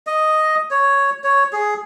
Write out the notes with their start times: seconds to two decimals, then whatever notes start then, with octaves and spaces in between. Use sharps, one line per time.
0.07 D#5
0.71 C#5
1.24 C#5
1.53 G#4